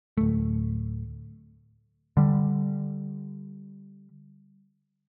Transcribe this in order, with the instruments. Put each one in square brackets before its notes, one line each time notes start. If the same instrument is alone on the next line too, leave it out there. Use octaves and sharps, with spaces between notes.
[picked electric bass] D1 A3
D3 G3